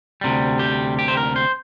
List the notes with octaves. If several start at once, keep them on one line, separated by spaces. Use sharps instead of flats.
D2 C3 G3
G4
G4
C5
A#4
C5